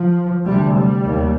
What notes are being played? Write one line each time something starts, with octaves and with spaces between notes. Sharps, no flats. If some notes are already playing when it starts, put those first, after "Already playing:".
Already playing: F3
D2 C3 G3
G3
D#2